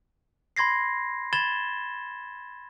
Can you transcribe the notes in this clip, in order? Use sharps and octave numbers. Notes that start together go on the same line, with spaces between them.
B5 C6 G#6 A#6 C7
B5 G#6 A6 E7 G7